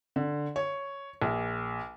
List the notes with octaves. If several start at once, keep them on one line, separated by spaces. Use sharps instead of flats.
D3
C#5
A#1